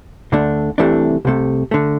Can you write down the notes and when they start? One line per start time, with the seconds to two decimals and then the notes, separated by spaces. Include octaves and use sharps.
0.32 D2 D3 A3 D4
0.78 C2 C3 E3 A3 D4
1.25 C2 C3 A3
1.71 D3 A3